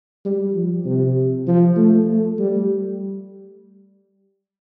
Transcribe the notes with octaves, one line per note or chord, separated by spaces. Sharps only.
G3
F3
C3
F3
A3
A3
G3